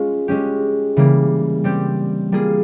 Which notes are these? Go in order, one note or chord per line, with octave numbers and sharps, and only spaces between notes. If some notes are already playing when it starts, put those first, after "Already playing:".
Already playing: G#3 C#4 F4
G#3 C#4 G4
C#3 E3 G3 A#3
G3 C4 G4
G3 A#3 F4 G#4